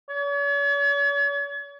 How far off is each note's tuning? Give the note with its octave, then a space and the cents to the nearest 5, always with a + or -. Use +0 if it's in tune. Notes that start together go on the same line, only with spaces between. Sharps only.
C#5 +40